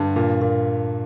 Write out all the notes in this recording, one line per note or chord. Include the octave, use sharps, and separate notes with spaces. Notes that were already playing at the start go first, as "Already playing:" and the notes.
Already playing: G2 D3
A#2
A#2